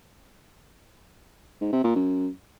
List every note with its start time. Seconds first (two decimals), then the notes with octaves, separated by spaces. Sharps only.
1.61 G#2
1.73 C3
1.84 A#2
1.96 F#2